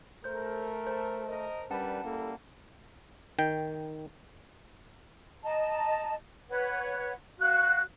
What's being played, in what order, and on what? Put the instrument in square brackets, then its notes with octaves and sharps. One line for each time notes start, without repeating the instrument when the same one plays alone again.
[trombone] A3 [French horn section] A4 A#4 [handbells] C5 G6
[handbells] C5 A5
[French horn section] A#4 D#5
[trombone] G3 [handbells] C#4 F#5 A5 [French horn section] D4 A#4 B4
[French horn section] G3 E4 A4 [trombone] A#3
[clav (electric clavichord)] D#3 G5
[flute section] D#5 A5 A#5
B4 C#5 F#5
F#4 F5 F#6